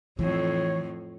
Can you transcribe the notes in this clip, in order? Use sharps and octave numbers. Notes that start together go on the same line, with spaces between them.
F2 A2 E3 C#5